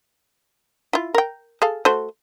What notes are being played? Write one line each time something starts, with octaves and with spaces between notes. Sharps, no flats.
E4 F4
A#4 G5
G#4 A4 F5
A3 F#4 C5